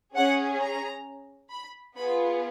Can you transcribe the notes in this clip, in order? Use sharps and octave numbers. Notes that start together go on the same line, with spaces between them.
C#4 G#4 F#5
A#5
B5
B3 F4 G#4 B5